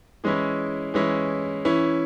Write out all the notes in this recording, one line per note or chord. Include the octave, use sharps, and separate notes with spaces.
E3 G#3 C#4 E4
E3 G#3 C#4 E4
E3 C#4 E4